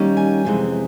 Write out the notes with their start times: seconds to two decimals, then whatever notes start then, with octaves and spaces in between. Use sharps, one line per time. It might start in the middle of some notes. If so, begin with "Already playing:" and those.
Already playing: D#3 G3 A#3 C#4
0.17 G#5
0.45 F2 C3 E3 G#3